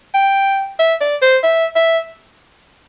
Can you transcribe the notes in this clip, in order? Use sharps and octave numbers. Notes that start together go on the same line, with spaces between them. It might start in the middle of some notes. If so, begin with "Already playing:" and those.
G5
E5
D5
C5
E5
E5